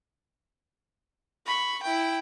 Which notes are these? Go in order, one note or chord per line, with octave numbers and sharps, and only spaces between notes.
B5 C#6
E4 G5